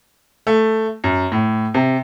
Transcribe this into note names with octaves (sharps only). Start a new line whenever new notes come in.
A3
F#2
A2
C3